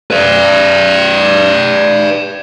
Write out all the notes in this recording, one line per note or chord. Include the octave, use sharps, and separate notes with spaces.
B4 D5